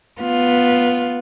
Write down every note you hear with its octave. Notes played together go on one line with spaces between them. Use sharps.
B3 F4